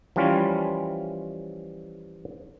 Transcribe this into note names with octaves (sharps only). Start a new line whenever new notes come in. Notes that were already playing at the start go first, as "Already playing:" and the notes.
E3 F3 G3 C#4 F4